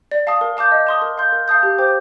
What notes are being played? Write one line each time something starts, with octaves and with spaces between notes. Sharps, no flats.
D5
F5 A5 D#6
A#4
F5 A5 D6 G6
D#5
A5 C6 D#6
A#4
F5 C6 G6
A#4
F5 A5 D#6 G6
G4
C5 G5 D6 G6